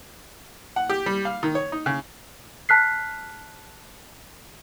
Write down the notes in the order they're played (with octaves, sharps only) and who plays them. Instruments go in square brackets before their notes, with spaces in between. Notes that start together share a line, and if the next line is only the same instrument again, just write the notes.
[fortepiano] F#5
G4
G3
F5
D#3
C#5
D#4
C#3
[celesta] A5 F6 F#6 B6 C7